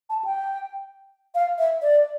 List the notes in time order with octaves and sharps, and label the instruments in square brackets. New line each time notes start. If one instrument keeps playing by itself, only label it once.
[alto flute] A5
G5
F5
E5
D5